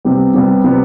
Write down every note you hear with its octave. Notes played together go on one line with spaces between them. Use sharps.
C3 G3 B3
C3 G3 B3
C3 G3 B3